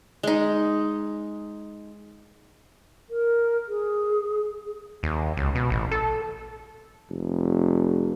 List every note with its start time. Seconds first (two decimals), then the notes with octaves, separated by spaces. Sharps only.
0.23 G#3 D#4
3.09 A#4
3.68 G#4
5.03 D#2
5.37 C#2
5.55 B2
5.70 A1
5.91 A4
7.10 F1